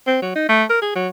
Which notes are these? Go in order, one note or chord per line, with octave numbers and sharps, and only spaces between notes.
C4
F#3
D#4
A3
A#4
G#4
F#3